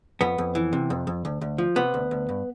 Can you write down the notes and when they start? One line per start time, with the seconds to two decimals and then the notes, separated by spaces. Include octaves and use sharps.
0.21 F2 B3
0.38 F2
0.55 E3
0.73 C3
0.90 F2
1.07 F2
1.25 D2
1.41 D2
1.58 F3
1.76 C3 B3
1.94 D2
2.11 D2
2.29 G2